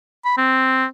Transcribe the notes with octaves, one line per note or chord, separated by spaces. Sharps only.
B5
C4